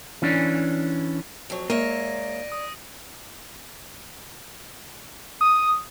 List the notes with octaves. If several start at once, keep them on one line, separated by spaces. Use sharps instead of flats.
E3 C#4 D4
F2 F#3 C#5
G#3 A#3 C#5 D5 E5 A#6 D7 D#7
D#6
D#6